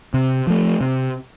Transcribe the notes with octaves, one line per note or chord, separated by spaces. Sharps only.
C3
F3 A3
C3